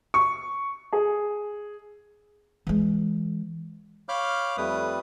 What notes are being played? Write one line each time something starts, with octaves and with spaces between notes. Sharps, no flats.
C#6
G#4
E3 G#3
C#5 F5 B5 D6 F6 G6
F2 G3 A3 B4 D#6